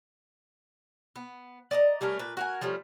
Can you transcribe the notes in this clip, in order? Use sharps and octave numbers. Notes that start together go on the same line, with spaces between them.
B3
D5 D#5 A5 A#5
G3 A3 C#4 A#4
A#2 B4
F#4 A#4 G#5
F3 G3 A3 C#4